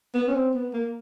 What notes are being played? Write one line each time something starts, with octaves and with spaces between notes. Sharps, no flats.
B3
C#4
C4
B3
A#3